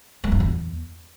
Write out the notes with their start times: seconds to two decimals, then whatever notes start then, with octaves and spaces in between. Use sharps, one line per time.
0.24 G3
0.32 G2
0.40 E2